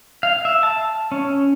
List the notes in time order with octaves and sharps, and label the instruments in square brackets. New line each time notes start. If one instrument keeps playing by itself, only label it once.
[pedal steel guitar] F5
E5
A5
C#4